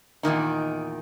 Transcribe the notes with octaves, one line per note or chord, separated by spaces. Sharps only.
E2 A#2 D#3 D#4